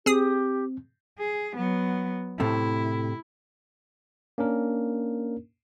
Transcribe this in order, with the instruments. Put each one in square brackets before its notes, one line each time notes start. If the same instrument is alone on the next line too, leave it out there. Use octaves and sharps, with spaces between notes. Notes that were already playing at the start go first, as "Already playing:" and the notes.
[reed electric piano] C4 [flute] G4 [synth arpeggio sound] G#4 D#6
[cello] G#4
F#3 B3
[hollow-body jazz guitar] A2 C3 A3 [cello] E4
[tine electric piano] A#3 C#4 D4 A#4